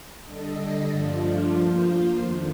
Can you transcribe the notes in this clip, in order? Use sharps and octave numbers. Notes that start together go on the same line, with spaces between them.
D3 G3 D4 A4 D#5
G2 F3 A3 D4 F4
F3 A#3 F4 C5
F2 D#3 A3 D4